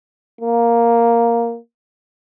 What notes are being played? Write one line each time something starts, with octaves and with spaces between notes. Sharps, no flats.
A#3